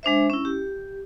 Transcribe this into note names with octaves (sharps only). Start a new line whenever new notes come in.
G#3 D4 C5 E5
C#4 E4
G4